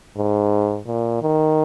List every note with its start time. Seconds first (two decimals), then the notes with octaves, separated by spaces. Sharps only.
0.17 G#2
0.87 A#2
1.22 D#3